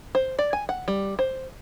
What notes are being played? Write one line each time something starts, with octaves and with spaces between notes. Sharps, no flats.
C5
D5
G#5
F#5
G3
C5